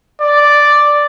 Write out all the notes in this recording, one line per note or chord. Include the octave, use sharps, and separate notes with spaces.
D5